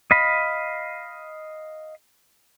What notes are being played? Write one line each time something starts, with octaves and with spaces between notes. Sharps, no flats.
D#5 F5 B5